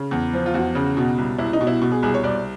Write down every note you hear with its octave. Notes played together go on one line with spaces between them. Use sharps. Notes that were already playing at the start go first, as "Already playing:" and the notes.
Already playing: C#3
E2
F3
F4
E2 F#4
C#3
B2
C2
C2 E4
D#4
B2
E4
B2
G#4
C2 G#4
C#5
C2 D5